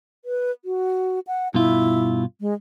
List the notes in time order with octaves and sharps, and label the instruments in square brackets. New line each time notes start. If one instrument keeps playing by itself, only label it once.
[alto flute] B4
F#4
F#5
[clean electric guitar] G2 B2 F4 [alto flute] E4
[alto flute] G#3